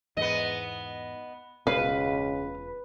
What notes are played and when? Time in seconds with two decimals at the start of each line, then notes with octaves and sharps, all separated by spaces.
0.17 E2 G#2 B3 D#5
1.67 E1 C#2 B2 C#4 B4 F5